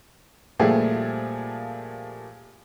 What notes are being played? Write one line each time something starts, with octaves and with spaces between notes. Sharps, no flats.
A#2 F3 G3 A3 G4 G#4